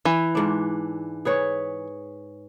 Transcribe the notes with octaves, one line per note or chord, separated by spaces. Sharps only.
E3
G#2 D4
G#4 B4 C#5